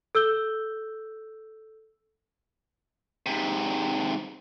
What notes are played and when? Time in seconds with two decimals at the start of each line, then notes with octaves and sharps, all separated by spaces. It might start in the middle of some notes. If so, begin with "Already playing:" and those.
0.15 A4 E6 G6 G7
3.26 G#2 C3